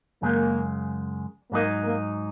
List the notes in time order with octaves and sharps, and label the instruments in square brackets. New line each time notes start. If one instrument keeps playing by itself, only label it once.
[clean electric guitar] F#2 C#3 G#3 [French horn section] A#3
[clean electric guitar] G#2 F#3 D#4 [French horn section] A#3
[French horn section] A#3